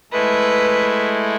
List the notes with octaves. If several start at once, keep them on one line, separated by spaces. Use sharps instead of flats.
G#3 A3 E4 B4